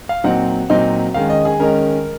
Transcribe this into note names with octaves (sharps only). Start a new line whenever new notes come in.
F5
A#2 F#3 C4 D#4 F#5
A#2 F#3 C4 D#4
D#3 G#3 C#4 F5
D#5
G#4
D#3 G#3 C#4 A#4